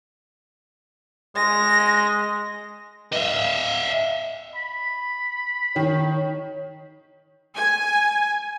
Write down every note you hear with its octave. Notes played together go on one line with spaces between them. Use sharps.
G#3 A#6
D#5 E5
B5
D#3 C#5
G#5